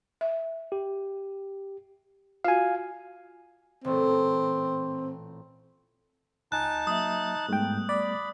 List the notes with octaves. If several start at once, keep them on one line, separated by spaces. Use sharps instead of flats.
E5
G4
F4 F#4 F5 G#5
A1 A#2 A3 C4
C#2 D#4 G#5 A5 F#6
F#3 A#3 E5 D#6
G#2 G3 A3 B3 G5
D5 B5